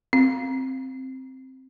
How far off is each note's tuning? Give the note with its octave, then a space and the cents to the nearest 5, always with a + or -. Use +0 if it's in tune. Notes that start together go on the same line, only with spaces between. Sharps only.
C4 +0 F5 +0